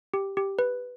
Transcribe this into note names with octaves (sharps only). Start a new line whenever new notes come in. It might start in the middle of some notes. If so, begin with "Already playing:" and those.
G4
G4
B4